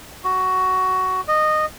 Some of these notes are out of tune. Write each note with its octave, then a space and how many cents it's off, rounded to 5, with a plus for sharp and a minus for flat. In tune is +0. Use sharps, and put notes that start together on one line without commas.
F#4 +10
D#5 -15